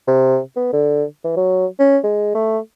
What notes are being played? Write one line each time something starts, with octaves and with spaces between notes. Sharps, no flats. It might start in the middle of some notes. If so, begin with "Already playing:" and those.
C3
B3
D3
E3
F#3
C#4
G#3
A3